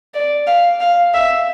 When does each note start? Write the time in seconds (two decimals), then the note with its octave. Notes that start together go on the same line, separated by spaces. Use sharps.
0.14 D5
0.47 F5
0.81 F5
1.14 E5